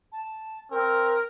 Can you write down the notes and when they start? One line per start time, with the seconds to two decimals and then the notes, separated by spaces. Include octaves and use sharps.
0.12 A5
0.71 C4 A#4